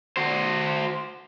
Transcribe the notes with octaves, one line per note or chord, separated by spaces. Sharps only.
F#4 C5